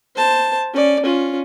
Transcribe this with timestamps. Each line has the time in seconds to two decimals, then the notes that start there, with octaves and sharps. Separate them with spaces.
0.16 C5 A5
0.73 C#4 D5
1.03 C#4 F4